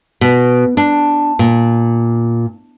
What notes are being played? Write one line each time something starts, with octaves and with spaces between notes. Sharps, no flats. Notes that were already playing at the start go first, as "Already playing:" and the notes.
B2
D4
A#2